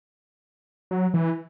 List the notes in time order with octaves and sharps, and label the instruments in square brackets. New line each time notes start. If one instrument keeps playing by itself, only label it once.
[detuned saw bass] F#3
E3